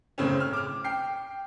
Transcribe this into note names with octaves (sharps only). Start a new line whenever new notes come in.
F#1 A2 C#3 C4 C#4
F6
D6 F6
G5 C7